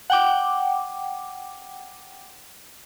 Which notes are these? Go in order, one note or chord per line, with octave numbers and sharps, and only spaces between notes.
F#5 G5 D6